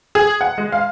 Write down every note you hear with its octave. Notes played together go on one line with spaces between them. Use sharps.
G#4
F#5
G#3
F5